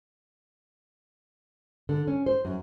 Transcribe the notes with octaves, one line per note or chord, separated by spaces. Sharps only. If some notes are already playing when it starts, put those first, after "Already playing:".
D3
C#4
C5
F#2